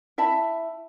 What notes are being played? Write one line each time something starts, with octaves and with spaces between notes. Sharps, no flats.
E4 E5 A5 B5